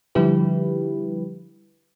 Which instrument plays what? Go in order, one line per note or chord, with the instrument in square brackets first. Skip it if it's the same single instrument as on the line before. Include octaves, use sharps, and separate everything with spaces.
[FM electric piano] D3 F3 G3 E4 G4 B4